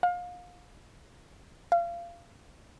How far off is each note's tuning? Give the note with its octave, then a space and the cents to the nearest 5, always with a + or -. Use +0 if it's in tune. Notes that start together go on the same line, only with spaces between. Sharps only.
F5 +30
F5 -25